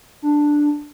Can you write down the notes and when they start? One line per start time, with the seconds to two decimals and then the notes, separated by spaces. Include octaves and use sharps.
0.22 D4